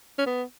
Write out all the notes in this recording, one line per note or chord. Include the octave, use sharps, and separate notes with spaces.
C#4
B3